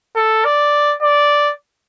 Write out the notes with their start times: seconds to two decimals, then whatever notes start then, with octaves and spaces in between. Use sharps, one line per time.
0.16 A4
0.45 D5
1.01 D5